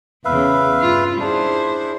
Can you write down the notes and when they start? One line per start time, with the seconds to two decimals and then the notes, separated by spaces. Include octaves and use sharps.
0.25 E2 C#3 B4 E5 F5
0.80 G2 F4
1.20 D4 E4 G#4 C5